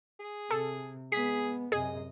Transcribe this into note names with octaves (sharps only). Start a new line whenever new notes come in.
G#4
C3 A4
G#3 B3 G#4 B6
F#2 C3 G#4 D#5